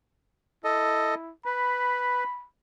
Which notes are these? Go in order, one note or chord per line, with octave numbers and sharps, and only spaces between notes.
E4 A4 D#5
B4 B5